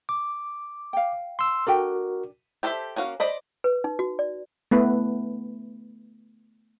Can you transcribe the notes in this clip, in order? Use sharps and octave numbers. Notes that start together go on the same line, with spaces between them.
D6
F5 G5
C6 E6
D4 F#4 A4 A#4 G5
G4 A4 C5 D#5 E5
A#3 C#4 F#4 F5
C5 D5 D#5 B5
B4
D#4
F#4
D5
A3 B3 E4 B4